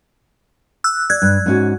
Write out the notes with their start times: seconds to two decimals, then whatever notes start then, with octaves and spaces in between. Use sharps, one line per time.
0.84 E6 F#6
1.10 D5 F#6 G#6
1.22 G2
1.46 G#2 C#4 F#4